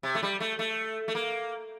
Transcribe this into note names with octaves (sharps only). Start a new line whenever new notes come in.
C3
A3
G3
A3
A3
A3
A#3